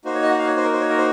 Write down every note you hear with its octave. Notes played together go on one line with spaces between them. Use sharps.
A#3 D#4 F#4 C5
C#5
D#5
F#5
F5
C#5
C5
A#4
C5
C#5
A#4
C5